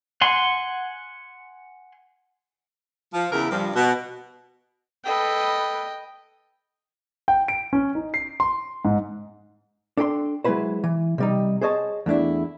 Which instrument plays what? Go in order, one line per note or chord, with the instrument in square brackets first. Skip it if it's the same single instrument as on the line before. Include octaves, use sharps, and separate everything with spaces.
[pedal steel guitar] F#5 G#5 C6
[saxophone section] F3
E2 C#3 E4 A#4
G2 F3
B2
[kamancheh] A4 B4 [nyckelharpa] D#5 G5
[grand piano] G5
D7
C#4
D#4
C7
C6
G#2
[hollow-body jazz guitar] D4 A4 G5 B5 C6
F#3 G#3 C4 E4 B4 C5
E3
C3 G3 D#4
G#4 C5 C#5 D#5 A5
E2 A3 D4 E4